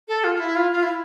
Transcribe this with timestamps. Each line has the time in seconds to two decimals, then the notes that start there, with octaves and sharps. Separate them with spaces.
0.08 A4
0.24 F4
0.35 F4
0.40 E4
0.56 F4
0.71 F4
0.83 E4